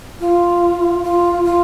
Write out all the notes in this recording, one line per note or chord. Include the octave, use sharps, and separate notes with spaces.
F4
F4
F4